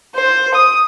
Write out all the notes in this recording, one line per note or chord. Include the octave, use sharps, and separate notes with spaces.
C5
D#6